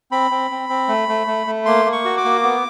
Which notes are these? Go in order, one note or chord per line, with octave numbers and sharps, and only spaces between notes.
C4 B5
C4
C4
C4
A3
A3
A3
A3
A#3 C6
A#3
C#6
F#4
D6
A#3
B3